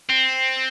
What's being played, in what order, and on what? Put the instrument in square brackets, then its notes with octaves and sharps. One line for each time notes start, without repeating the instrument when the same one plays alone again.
[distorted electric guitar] C4